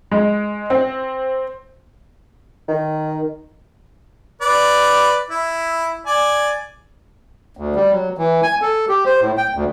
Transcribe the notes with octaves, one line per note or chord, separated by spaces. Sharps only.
G#3
C4
D#3
B4 D5
E4
D5 G#5
D2
G3
F#3
E3
G#5
A4
G4
C5
A2
G5
D2